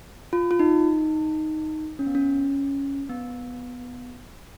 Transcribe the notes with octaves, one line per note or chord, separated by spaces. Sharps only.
F4
F4
D#4
C#4
B3
C#4
B3